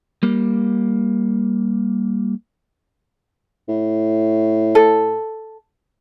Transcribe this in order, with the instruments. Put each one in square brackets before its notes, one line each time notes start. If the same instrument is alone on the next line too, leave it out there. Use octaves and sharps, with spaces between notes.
[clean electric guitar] G3 A#3
[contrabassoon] A2
[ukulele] A4